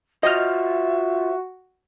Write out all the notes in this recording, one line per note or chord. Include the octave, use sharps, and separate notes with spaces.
F4 F#4 C5 D#5 E5 F#5 F6